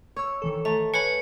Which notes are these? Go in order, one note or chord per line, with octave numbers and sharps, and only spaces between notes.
C#5 C#6 E6
D#3 E3 A4
A3 A#5
B4 C#5 G#5 B5 C7 C#7